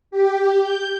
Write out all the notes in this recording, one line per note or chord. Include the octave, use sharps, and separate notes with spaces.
G4
G6